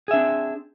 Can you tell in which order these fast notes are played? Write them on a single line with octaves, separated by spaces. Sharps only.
G#4 E5 D4 C4